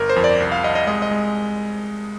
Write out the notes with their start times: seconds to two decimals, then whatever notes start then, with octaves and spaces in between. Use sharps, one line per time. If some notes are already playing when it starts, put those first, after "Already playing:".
Already playing: G1 A#4
0.09 C5
0.16 F2
0.24 D5
0.40 C2
0.52 F5
0.63 C2 D#5
0.75 D#5
0.87 G#3 D#5
1.02 D#5
1.11 G#3